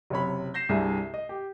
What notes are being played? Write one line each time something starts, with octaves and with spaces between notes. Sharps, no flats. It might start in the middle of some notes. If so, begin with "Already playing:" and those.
F#1 C3 C#5 B5
G6 A#6 C7 E7
C2 G2 C3 G#4 E5
D#5
G4